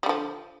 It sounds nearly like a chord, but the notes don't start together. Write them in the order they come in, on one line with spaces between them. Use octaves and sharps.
G3 D3 F3